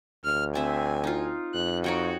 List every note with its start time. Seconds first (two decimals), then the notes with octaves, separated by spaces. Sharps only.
0.25 D2 F6
0.55 C4 E5 G#5
1.04 D#4 F4
1.54 F2 F#6
1.84 D#4 F#4 C#5 G5